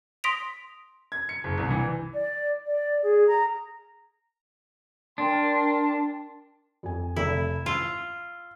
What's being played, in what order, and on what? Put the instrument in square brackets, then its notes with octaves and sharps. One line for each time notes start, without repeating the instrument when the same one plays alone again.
[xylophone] C6 D#6 A#6 B6 D7 F7
[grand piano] G#6
C#7
F#1
C2
E3
[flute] D5
D5
G#4
A#5
[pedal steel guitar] D4 [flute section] A#4 G5 C6
[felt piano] F2 G#5
[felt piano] F1 A4 [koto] E4
[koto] F4 [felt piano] E6